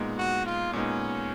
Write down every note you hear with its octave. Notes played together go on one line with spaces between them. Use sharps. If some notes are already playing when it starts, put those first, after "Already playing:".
Already playing: A#2 G#3 B3 D#4
F#4
F4
A#2 G#3 B3 C#4 D#4